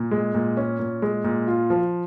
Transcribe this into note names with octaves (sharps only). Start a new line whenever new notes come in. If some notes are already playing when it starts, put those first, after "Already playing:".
Already playing: A#2
G#3
A#2
C#4
A#2
G#3
A#2
F4
F3